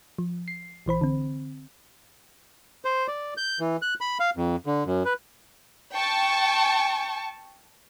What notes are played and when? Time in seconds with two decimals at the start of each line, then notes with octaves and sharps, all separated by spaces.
0.18 F3
0.48 C7
0.86 A#1 E3 C5 B5
1.01 D3 C4
2.85 C5
3.08 D5
3.37 G6
3.60 E3
3.82 F#6
4.01 B5
4.20 F5
4.37 F2
4.66 D3
4.86 F#2
5.05 B4
5.93 G5 A5 C#6